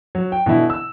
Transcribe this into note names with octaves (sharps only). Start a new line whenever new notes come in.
F#3
G5
B2 D3 E3 E4
E6